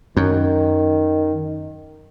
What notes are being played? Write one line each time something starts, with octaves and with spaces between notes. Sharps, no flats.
F#2 D#3